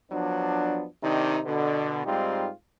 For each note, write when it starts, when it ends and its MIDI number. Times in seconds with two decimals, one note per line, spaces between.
0.12 0.85 53
0.12 0.85 54
0.12 0.85 59
0.12 0.85 62
1.03 1.39 48
1.03 1.39 51
1.03 1.39 62
1.03 1.39 63
1.45 2.04 47
1.45 2.04 50
2.05 2.49 44
2.05 2.49 55
2.05 2.49 60
2.05 2.49 63
2.05 2.49 65
2.05 2.49 67